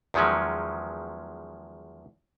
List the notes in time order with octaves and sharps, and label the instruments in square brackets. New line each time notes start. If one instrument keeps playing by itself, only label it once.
[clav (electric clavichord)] E2 D#3 F3 F#3 G#3 C#4